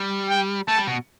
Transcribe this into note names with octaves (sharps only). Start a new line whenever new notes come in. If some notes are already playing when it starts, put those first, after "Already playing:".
Already playing: G3
G5
A3 A5
G3
B2